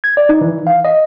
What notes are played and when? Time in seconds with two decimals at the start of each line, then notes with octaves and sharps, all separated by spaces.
0.04 G#6
0.17 D5
0.29 D#4
0.41 E3
0.67 F5
0.85 D#5